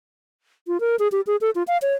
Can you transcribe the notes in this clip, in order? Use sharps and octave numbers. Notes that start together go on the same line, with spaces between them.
F4
A#4
G#4
G4
G#4
A4
F4
F5
C#5